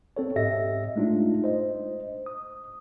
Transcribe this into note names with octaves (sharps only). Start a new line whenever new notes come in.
C4 A4 C#5
G#2 G4 D#5 E5 A#6
G#3 A3 D4 D#4 F4
C5 D#5
D#6